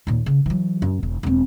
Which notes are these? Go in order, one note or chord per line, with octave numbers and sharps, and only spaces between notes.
D#2 A#2
C#3
E3 F#3
F#2
E1
E1 C4